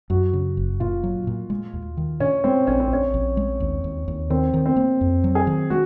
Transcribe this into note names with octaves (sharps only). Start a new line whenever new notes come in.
F#2 F#4
C#3
F#1
A#2 F4
F#3
A#2
G#3
D#2
D#3
A#2 C#4
G#3 C4
A#1 C#4
C4
A#1 C#4
A#1
G#3
D#2
D#2
D#2
D#3 C4
D#3
C4
A#3
F2
F#3
G#4
D#3
G#3 F#4